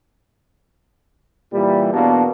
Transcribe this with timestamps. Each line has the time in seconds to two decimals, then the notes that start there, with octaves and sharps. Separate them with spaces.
1.53 A#2 E3 G3
1.93 E2 B2 A#3 D4